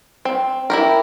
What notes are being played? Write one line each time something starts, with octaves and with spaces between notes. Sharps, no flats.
C4
E4 G4 A#4